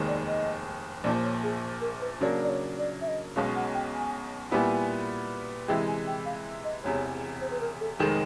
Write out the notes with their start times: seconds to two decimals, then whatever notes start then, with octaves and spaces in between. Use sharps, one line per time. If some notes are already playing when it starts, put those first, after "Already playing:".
Already playing: F1 D#2 D#3 G#3
0.08 D5
0.27 D#5
1.04 A#1 A#2 F3 D5
1.23 C#5
1.43 G#4
1.81 A#4
2.01 B4
2.21 C#3 F#3 A#3 D4
2.44 D5
2.49 C#5
2.78 D5
3.01 E5
3.08 D#5
3.36 B1 B2 G#3 C#4 F5
3.56 F#5
3.74 G5
3.94 G#5
4.51 A#2 G3 B3 E4 G#5
5.68 C3 E3 G#3 G5
5.88 G#5
6.07 G5
6.26 F5
6.64 D#5
6.84 E1 E2 C3 C#5
7.41 C5
7.51 B4
7.61 A#4
7.80 A4
7.99 F1 D#3 G#3 A4